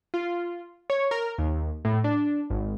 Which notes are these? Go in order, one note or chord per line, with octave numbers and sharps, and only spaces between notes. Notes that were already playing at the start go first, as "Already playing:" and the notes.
F4
C#5
A#4
D#2
A2
D4
G#1